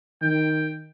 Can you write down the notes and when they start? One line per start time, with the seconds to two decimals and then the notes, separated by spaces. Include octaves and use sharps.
0.22 D#3 G5